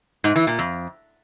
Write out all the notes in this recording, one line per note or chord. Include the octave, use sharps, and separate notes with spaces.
G#2
E3
A#2
F2